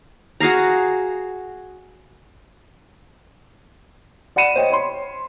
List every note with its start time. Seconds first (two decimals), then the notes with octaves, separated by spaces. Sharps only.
0.40 F#4 G#4 F5 A#5
4.36 D5 F#5 B5 C#7 D#7 E7
4.56 C5 C#5 D#5 G5
4.70 C#5 B5 C6